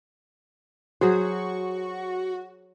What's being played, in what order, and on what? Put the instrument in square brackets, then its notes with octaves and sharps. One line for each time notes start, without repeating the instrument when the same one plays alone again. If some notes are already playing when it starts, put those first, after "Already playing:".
[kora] F#3 G#4 C5 [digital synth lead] F#4